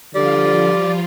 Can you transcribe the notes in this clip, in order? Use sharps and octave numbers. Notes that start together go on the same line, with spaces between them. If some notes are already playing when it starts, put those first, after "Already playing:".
D3 F3 G3 F4 D5